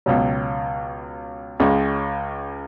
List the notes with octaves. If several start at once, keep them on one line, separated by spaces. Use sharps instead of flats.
C#2 B2 F#3
C#2 C#3 G#3